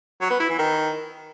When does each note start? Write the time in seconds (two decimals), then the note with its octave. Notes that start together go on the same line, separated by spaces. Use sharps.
0.21 F#3
0.30 B3
0.40 E4
0.49 E3
0.59 D#3